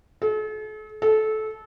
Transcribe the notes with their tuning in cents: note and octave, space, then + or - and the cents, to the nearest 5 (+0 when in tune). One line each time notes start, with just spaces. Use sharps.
A4 -45
A4 -20